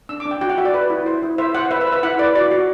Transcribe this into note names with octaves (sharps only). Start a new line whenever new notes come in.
D4 E6
D6
D4
G5
F#4 G5
F#5
F#4 E5
D5
B4
E4
C5
E4
C5 E5
C5 F#5
B4 E5
E5
B4
E5
E4 F#5
B4 D5
F#4 D5
F#4